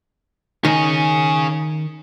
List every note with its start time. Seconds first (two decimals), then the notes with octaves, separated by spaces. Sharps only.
0.65 D#3 C#4 G#4